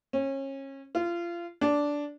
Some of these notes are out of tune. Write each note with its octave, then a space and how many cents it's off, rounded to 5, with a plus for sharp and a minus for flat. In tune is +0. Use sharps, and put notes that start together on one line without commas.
C#4 -30
F4 -25
D4 -10